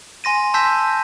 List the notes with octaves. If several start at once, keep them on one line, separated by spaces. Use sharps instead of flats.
G#5 C6 A#6 D#7
A5 C6 E6 G6 A#6 B6